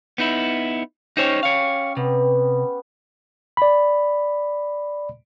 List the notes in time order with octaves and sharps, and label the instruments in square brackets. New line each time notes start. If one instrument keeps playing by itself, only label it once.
[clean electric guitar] B3 D#4 E4
[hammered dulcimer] C#4 G4 [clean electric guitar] D#4 C5 C#5
[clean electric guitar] C#5 F5
[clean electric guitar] C3 [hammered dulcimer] B3
[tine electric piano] D5 B5